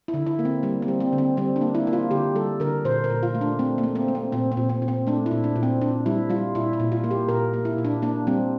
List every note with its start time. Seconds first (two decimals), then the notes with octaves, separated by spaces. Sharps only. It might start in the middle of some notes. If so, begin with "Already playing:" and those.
0.08 E4
0.14 D3
0.27 E4
0.39 A#3
0.45 C4
0.63 G3 A#3
0.82 C4
0.88 G3
1.00 C4
1.13 D3
1.18 C4
1.37 G3 C4
1.56 D4
1.61 A#3
1.75 E4
1.87 A#3
1.93 F4
2.11 D3 G4
2.35 G3 A4
2.60 D3 A#4
2.85 A#2 C5
3.04 A#4
3.10 A#2
3.23 F4
3.35 A3
3.41 D4
3.59 A3 C4
3.78 A#3
3.84 A3
3.95 C4
4.08 A3
4.15 C4
4.32 A#2 C4
4.52 C4
4.57 A#2
4.69 C4
4.82 A#2
4.88 C4
5.07 A3 D4
5.26 E4
5.31 A#2
5.44 D4
5.56 A#2
5.63 C4
5.81 A#2 D4
6.06 G3 E4
6.30 G3 F4
6.55 A#2 E4
6.73 E4
6.80 A#2
6.92 F4
7.04 A#3
7.11 G4
7.29 A#2 A#4
7.53 A#3
7.65 E4
7.78 A#2
7.85 D4
8.02 A#3 D4
8.27 G3 C4